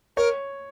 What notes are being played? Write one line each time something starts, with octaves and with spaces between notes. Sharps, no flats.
A#4 C#5